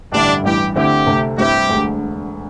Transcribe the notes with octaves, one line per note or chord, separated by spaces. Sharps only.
A1 G2 D3 G3 D4 E4
A1 G2 E3 G4
D2 D3 C4 E4 G4
D2 C3 A3
G2 G3 C4 E4 G4
E1 D2 D3